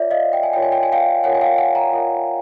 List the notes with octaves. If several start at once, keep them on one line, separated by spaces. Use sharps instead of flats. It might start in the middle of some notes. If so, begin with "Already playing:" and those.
Already playing: F4 A#4 C#5 D5 E5
D#5 F5
G5
G#5
F4 A#4 C#5 G5
G#5
G5
G#5
F5 G5
F4 A#4 C#5 F#5 G#5
G#5
F5 G5
F#5 G#5
G#5 A#5
F4 A#4 C#5